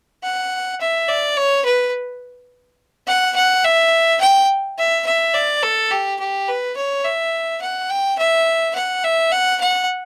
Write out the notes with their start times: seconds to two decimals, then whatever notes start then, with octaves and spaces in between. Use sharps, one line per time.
0.23 F#5
0.81 E5
1.08 D5
1.36 C#5
1.65 B4
3.07 F#5
3.36 F#5
3.64 E5
4.21 G5
4.78 E5
5.06 E5
5.34 D5
5.63 A4
5.91 G4
6.19 G4
6.48 B4
6.76 C#5
7.05 E5
7.62 F#5
7.90 G5
8.18 E5
8.75 F#5
9.04 E5
9.32 F#5
9.60 F#5